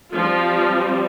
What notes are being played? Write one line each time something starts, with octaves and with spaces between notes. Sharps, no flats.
F3 G3 C4 F4